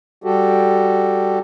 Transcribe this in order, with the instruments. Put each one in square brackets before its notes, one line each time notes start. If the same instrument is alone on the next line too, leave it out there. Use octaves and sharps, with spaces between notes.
[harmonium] G3 F#4 G4 A4